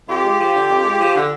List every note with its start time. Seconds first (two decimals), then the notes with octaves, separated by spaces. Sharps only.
0.09 F2 F4 G4
0.24 G#3
0.40 F3
0.55 D3
0.70 F2
0.84 G#3
1.01 F3
1.16 D3